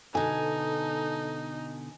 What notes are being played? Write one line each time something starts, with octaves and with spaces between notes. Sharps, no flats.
B2 D3 D#4 A4 G#5